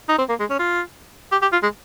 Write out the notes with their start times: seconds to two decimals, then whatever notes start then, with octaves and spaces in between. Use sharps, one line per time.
0.09 D#4
0.18 C4
0.29 A#3
0.40 G#3
0.50 C#4
0.59 F4
1.32 G4
1.42 G4
1.53 F4
1.63 G#3